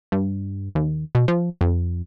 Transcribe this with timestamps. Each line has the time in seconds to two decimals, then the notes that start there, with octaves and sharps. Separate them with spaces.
0.12 G2
0.75 D#2
1.15 B2
1.28 F3
1.61 F2